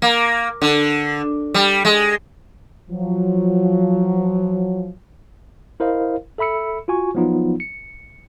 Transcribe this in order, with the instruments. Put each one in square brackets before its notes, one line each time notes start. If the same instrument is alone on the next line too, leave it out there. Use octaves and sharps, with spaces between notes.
[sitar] A#3
D3
G3
G#3
[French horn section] F3 F#3
[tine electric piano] E4 A#4 C5 D#5 F5
A4 E5 B5 E6 C#7
F4 F#4 G#5 C#6
F3 F#3 B3 D#4 F4
C#7